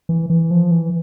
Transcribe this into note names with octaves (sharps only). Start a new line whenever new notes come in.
E3
E3
F3
E3